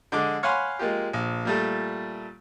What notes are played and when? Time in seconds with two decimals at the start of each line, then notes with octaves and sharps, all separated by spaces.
0.12 D3 G#3 D6
0.43 C#5 F5 F#5 G#5 B5 C6
0.79 G#3 A#3 F4 G4
1.13 A#1
1.45 A#2 G3 A3